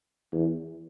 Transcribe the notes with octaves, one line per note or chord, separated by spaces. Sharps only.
E2